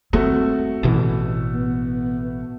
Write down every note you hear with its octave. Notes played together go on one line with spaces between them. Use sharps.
A3 C4 F#4
A1 B2 E3
B3